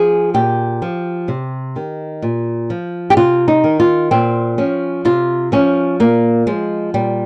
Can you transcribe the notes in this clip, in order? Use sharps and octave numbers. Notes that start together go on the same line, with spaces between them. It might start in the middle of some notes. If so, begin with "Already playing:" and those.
Already playing: F3 G#4
A#2 G4
F3
C3
D#3
A#2
F3
G4
C3 F4
D#4
D#3
F4
A#2 C4
F3 C#4
C3 F4
F3 C#4
A#2 A#3
F3 G#3
A#2 G3